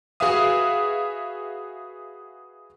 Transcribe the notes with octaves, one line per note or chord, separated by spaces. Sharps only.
F#4 G#4 B4 E5 F5 D#6